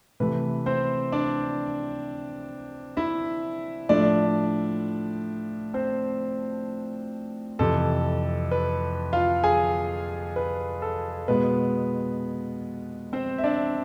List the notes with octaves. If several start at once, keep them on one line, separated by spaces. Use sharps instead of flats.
C3 E3 A3 B4
C4 C5
D4 D5
E4 E5
A2 F3 A3 D4 D5
C4 C5
F2 C3 E3 A4
B4
F4 F5
G#4 G#5
B4
A4
B2 G#3 B3 B4
C4 C5
E5
D4 D5